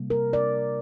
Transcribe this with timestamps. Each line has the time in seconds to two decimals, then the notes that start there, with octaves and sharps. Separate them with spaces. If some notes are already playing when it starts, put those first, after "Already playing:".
Already playing: C3 G3 A#3
0.10 A#4
0.33 D5